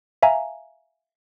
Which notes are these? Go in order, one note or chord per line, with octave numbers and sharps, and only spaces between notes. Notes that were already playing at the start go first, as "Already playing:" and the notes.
E5 F5 G#5 A#5